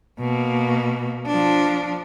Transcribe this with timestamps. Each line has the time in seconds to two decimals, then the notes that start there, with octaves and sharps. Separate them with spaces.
0.20 B2 A#3
1.27 F3 D4